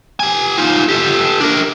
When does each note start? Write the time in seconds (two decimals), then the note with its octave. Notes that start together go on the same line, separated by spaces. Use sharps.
0.20 G4 G#5
0.58 D#4 F4
0.89 G4 A4
1.40 D4 A#4